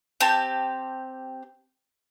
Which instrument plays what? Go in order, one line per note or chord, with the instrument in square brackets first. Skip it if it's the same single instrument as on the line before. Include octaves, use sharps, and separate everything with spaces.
[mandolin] C4 G4 A5